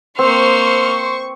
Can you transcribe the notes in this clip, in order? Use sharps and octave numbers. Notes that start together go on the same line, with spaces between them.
A#3 C4 C5 C#6 F6